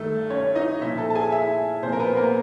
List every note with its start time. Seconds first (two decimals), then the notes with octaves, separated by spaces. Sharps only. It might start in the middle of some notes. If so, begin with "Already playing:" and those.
Already playing: G2 D#3 A3 A4
0.30 C#4 C#5
0.55 D#4 D#5
0.81 A#2 F3 E4 E5
0.98 A4 A5
1.10 A5
1.15 G#4 G#5
1.32 E4 E5
1.83 A#2 F3 C4 C5
1.93 A#4
2.00 B3 B4
2.17 A#3 A#4